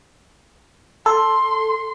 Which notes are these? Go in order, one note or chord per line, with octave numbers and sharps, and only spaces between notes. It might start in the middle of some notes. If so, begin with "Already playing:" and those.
A4 C6